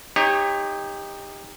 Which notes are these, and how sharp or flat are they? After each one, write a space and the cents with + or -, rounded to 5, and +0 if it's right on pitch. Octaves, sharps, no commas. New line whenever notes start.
D#4 +0 G4 +25 C#5 -15